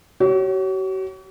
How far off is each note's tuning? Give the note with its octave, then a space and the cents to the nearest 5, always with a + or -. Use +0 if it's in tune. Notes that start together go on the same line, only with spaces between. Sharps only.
F#4 +45 C#5 +0